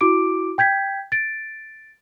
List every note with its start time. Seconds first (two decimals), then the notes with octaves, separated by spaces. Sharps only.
0.01 E4 F#4 D6 D7
0.58 G5 G6 G#6 B6
1.12 A6 D7